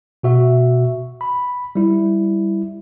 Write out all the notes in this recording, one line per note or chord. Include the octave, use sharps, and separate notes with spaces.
B2 F#4 E5
B5
G3 E4